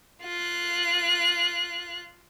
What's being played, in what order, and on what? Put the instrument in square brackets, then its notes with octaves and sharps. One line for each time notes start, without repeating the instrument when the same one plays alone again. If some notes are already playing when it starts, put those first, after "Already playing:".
[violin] F4 F#6